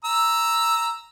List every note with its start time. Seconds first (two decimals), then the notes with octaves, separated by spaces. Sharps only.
0.04 A#5 E6